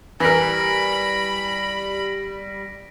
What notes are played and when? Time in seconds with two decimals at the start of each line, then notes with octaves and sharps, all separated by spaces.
0.20 E3 G3 A#4 B5 A#6 B6 D7